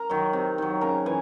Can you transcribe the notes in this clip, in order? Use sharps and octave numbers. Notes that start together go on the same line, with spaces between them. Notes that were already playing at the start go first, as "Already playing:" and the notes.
Already playing: A#4 A#5
D#3 F#3
C3
D#3 F#3
C#3 A#4 A#5
E3 G#5